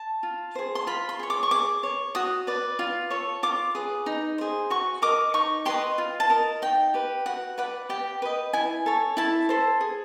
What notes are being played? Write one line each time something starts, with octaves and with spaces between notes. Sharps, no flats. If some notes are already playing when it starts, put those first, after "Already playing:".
Already playing: A5
F4
G#4 C5
C6
F4 B5
C6
G#4 C#5
D6
C#6
G#4 D6
C#5
F#4 D#6
B4 D5
F4
A4 C#5
F4 D6
G#4 B4
D#4
G#4 C5
F#4 C#6
A#4 D#5 D6
D#4 C#6
G4 B4 D#5 C6
F4
A5
A#4 D#5
D#4 G5
G4 B4
F#4 F#5
B4 D5 F#5
G4 G5
B4 D#5
E4 G#5
A4 C#5
E4 A5
A4 C5
G#4